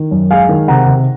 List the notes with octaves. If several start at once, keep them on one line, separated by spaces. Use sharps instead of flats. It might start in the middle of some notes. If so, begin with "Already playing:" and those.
Already playing: D#3
F#2
G#3 F5 G#5
D#3
C3 F#5 A#5
C3